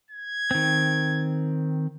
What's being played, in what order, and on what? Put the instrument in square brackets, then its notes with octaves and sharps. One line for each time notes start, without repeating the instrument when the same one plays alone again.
[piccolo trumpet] G#6
[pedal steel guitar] D#3 C4